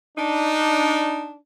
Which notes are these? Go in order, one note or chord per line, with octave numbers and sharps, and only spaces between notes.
D4 D#4